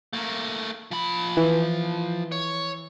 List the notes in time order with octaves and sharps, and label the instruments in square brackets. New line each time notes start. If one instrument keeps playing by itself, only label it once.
[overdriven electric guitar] A3 A#3
F3 B5
[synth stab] E3
[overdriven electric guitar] C#5